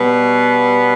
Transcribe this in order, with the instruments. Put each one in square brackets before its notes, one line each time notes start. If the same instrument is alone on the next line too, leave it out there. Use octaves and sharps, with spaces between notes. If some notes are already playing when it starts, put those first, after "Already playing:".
Already playing: [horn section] B2 G3 B3